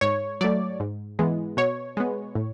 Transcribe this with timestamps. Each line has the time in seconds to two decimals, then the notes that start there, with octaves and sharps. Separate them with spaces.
0.01 G#2 C#5
0.41 F#3 A3 D5
0.80 G#2
1.19 E3 G#3 B3
1.57 B2 C#5
1.97 G#3 B3
2.35 A2